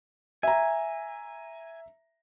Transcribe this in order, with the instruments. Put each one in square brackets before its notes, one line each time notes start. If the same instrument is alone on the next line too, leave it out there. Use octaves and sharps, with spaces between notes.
[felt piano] E5 A#5 [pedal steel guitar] G#5